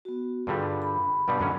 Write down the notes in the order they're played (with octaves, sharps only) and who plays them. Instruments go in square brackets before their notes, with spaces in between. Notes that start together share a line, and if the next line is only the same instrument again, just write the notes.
[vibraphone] B3 F#4
[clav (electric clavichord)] G2 D3 G3 [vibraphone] F4 G#4
[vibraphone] B5
[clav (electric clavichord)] G2 B2 G3
F#2 D3 C#4